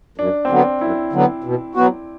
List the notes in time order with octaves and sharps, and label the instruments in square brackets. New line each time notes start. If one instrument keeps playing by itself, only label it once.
[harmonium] F#2 [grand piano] D4
[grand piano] C4
[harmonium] D3 F#3 B3 [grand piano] D4
[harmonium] F#2 [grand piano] E4
[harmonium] D3 F#3 B3
B2
F#3 B3 F#4